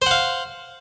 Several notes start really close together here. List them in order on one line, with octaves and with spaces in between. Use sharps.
C5 F#5 F5